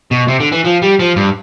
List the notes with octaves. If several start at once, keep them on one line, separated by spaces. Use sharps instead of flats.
B2
C3
D3
E3
F3
G3
F3
G2